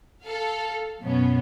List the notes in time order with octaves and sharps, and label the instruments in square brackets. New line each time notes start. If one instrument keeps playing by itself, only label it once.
[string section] A4 F5
F#2 B2 B3 C#4